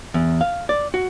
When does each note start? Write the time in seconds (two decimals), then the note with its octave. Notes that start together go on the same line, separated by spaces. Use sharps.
0.14 E2
0.41 F5
0.69 D5
0.94 F#4